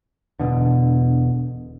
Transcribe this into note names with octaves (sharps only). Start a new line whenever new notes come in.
E1 B1 B2 D3